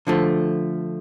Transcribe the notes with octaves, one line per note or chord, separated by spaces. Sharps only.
D3 F3 A3